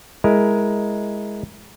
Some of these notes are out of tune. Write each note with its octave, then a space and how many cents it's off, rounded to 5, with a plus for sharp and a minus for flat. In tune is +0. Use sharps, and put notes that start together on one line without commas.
G#3 +0 E4 +0 A#4 +0